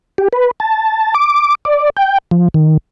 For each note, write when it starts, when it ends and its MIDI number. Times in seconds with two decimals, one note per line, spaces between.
0.18 0.28 67
0.33 0.51 71
0.60 1.14 81
1.14 1.55 86
1.65 1.90 74
1.97 2.18 79
2.31 2.48 53
2.54 2.77 51